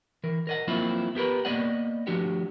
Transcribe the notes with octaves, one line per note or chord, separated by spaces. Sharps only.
E3 A#4
A#4 D#5 F#5
F3 F#3 A#3 C4 E4 F4
B3 G4 A#4 B4
A#3 B3 D5 D#5 F#5
F3 A3 D4 F#4 G4